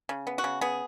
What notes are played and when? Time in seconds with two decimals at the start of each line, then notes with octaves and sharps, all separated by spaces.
0.09 C#3
0.27 B3
0.38 F#4
0.44 C#3
0.61 B3 G#4